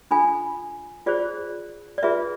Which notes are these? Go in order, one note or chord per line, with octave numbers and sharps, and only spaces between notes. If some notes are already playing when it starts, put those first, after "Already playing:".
D4 F4 A4 G#5 B5
F4 G#4 C5 D5
D5
F4 G#4 B4 E5